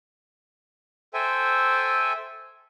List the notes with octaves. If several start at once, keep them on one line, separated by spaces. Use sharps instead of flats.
A4 C5 E5 G5 G#5